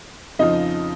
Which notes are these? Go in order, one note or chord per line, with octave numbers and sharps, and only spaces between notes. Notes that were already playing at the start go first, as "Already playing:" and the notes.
F2 C#3 F3 D#4 D#5